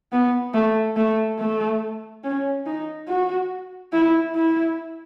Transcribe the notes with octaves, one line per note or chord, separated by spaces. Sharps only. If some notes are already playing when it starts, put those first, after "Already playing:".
B3
A3
A3
A3
C#4
D#4
F#4
E4
E4